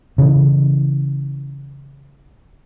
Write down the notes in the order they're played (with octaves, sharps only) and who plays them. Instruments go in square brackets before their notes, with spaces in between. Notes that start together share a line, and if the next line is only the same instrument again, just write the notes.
[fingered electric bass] C#3 E3